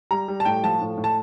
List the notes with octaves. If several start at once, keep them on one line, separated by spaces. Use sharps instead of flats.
G3 A#5
G3
A5
A2 G5
F3 A5
A2
A2
A5